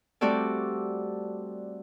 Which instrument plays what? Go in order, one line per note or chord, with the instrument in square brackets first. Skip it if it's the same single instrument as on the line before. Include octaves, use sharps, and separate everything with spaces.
[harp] G3 A3 C4 F#4 A4 D5